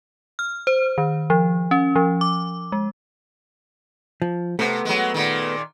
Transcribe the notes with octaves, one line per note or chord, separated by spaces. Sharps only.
F6
C5
D#3
F3
C#4
F3
D6
G#3
F3
C3 A3 B3
F#3 G#3
A#2 D#3